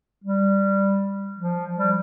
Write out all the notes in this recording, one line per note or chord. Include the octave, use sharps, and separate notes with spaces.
G3
F3
G3